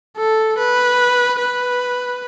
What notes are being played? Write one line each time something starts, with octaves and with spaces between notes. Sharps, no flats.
A4
B4
B4